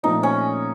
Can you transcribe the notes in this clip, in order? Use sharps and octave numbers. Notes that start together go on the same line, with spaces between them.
A#2 F3 A3 C4 D#4 F4
C#4